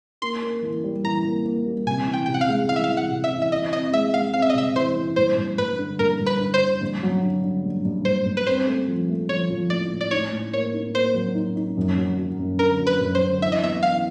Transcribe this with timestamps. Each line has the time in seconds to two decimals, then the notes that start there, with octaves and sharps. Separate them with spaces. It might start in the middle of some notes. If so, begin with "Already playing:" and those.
0.22 A#3 C6
0.42 A#3
0.63 E3
0.84 G3
1.04 E3 A#5
1.25 A#3
1.45 A#3
1.66 G3
1.86 C3 G#5
2.07 E3
2.13 G5
2.26 C3 G5
2.34 F#5
2.41 F5
2.49 G#3
2.69 E3 F5
2.76 E5
2.84 F5
2.90 E3
2.97 F#5
3.10 C3
3.24 E5
3.31 E3
3.42 E5
3.51 E3 D#5
3.72 C4 D#5
3.92 G#3 E5
4.13 G#3 F5
4.34 C4 F5
4.42 E5
4.50 D#5
4.55 C3 E5
4.75 E3 C5
4.96 E3
5.16 G2 C5
5.37 G2
5.57 G2 B4
5.79 D3
5.99 G2 A#4
6.20 G2
6.26 B4
6.40 D3
6.54 C5
6.61 D3
6.81 G2
7.03 F#3
7.23 D3
7.43 D3
7.64 G2
7.85 G2
8.05 G2 C5
8.25 G2
8.37 B4
8.47 C4 C5
8.67 A3
8.88 F3
9.09 A3
9.29 F3 C#5
9.50 F3
9.70 A2 D5
9.92 A2
10.01 D5
10.11 D#4 C#5
10.32 A2
10.53 A#3 C#5
10.74 D#4
10.94 A#3 C5
11.14 F#3
11.35 D#4
11.56 D#4
11.77 F#2
11.97 F#3
12.18 F#3
12.39 F#2
12.59 D3 A#4
12.80 F#3
12.87 B4
13.00 F#2
13.15 C5
13.21 D3
13.42 E3 E5
13.52 D#5
13.62 B3 E5
13.83 E3 F5